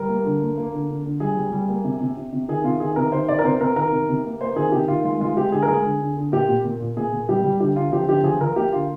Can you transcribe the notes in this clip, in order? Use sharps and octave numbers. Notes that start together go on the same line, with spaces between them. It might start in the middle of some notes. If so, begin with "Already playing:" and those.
Already playing: G3 A#4
A#3
D3
A#3
A#3
D3
D3
D3
G3 G#4
G3
G3
A#3
C3
C3
C3
C3
D#3 G#4
C3 F4
D#3 G#4
C3 A#4
D#3 C5
C3 D5
A#4
C3 C5
C3 A#4
D#3 A#4
C3
C3
A#3
A#3 C5
D#3 G#4
C3 G4
D#3 F4
G#3 F4
G#3 F4
G#3 G4
D3 G#4
A#4
G#3 G#4
D3
D3
D3
A#2 G4
A#2
A#2
A#2
A#2 G#4
A#2
G3 G4
G3
D3 G4
D3 F4
F3 G4
D3 G4
F3 G#4
F3 A#4
A#3 G4
D3 F4